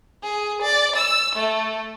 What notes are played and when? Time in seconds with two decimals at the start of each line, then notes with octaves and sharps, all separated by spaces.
0.23 G#4
0.62 D5
0.96 E6
1.36 A3